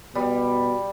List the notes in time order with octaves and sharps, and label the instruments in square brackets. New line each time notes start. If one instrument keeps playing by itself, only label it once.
[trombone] B2 [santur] G3